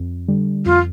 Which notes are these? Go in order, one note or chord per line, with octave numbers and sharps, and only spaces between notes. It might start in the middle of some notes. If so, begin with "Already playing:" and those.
Already playing: F2
D3 G3
F2 F4